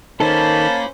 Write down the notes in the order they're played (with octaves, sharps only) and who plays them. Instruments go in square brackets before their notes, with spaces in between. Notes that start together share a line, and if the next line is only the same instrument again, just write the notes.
[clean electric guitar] D#3 D#4 A4 [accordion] A#3 [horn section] C#4 C5 B5 [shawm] A5